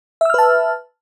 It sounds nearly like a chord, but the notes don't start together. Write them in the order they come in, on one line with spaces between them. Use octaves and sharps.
E5 E6 F6 B4 A5